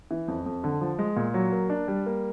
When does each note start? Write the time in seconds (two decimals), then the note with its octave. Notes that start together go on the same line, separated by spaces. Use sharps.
0.11 E3
0.28 F2
0.46 F2
0.64 D3
0.81 F3
0.98 G#3
1.16 A#2
1.34 F#3
1.52 A#3
1.70 D4
1.88 G3
2.06 A#3